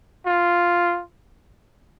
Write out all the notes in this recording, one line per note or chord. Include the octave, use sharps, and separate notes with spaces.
F4